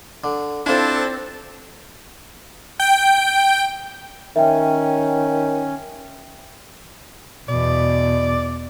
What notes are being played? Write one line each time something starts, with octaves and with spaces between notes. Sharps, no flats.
D3
C4 D4 E4 F4 A4
G5
D#3 C#4 E5 G5
E2 B2 D5